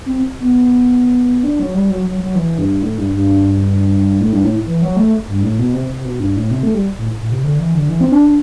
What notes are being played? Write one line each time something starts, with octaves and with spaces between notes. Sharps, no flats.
C4
B3
D4
F#3
G3
F#3
F#3
F#3
E3
G2
A2
G2
G2
A2
G2
A2
E3
F#3
A3
G2
A2
B2
C3
C3
B2
G2
A2
C3
A3
G3
A2
A2
C3
D3
E3
D3
E3
C4
D4
D4